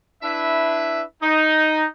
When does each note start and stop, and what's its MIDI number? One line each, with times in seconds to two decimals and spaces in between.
0.23 1.02 62
0.23 1.02 64
0.23 1.02 71
0.23 1.02 76
1.22 1.85 63